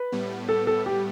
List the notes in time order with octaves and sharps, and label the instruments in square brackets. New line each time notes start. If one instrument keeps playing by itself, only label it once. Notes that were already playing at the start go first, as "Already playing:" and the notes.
Already playing: [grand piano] B4
[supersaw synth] A2 G3 B3
[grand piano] A4
A4
G4